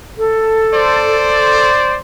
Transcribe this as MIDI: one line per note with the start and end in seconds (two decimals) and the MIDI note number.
0.18 1.68 69
0.75 1.98 72
0.75 1.98 74